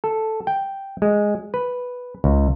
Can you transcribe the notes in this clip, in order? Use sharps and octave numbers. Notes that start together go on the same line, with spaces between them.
A4
G5
G#3
B4
C#2